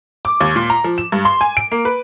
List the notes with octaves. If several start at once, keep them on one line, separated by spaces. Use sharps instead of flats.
D6
D#2
A#2
A#5
F3
E7
G2
C6
G#5
D7
A#3
B4